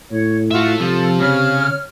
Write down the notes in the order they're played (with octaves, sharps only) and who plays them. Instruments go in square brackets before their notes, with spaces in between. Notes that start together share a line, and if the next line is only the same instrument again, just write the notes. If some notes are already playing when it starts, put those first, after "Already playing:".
[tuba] A2 [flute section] C#5
[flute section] F4 F#4 [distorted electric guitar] A4 E5
[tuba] C3 [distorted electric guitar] F3 [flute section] A4
[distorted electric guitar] C#3 [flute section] C#5 F6